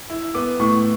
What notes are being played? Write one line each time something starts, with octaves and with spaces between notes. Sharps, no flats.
E4
B3 D6
A2 C#6